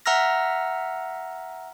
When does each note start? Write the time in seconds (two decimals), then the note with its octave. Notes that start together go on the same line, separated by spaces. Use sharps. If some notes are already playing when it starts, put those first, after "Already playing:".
0.06 E5 F#5 A#5 E6 F6 A#6